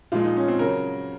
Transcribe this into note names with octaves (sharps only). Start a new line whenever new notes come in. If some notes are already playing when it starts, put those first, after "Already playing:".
A#2 F3 G#3 F4
D#4
C#4
C4
C#3 F#3 A#4